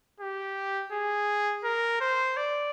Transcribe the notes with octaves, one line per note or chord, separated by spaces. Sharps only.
G4
G#4
A#4
C5
D5